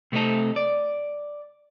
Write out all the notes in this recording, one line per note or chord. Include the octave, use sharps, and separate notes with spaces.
C3 A3 B3 C4 D#4 A4
D5